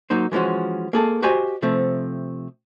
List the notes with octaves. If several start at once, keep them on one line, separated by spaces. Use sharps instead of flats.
F#3 A#3 D#4 C5
E3 F3 G#3 C#4 F#4
A#3 G#4 A4
F#4 G4 C5 D#5 G#5
C3 F3 A3 C4